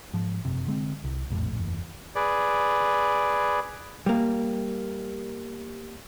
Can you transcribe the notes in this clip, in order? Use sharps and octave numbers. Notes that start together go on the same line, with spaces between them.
G#2 F3
F#1 C3
D3 G#3 C4
C2
E1 A#1 F2 A2
F#1 E2
G#4 B4 D5
G3 A#3